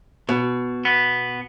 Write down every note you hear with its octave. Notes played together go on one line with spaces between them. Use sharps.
B2
B3